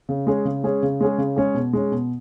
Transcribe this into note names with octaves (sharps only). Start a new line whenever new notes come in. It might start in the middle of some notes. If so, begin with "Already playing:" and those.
C#3
G#3 C#4 G#4
C#3
G#3 C#4 G#4
C#3
G#3 C#4 G#4
C#3
G#3 C#4 G#4
B2
G#3 C#4
B2